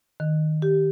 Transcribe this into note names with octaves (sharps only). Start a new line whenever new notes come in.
D#3
G4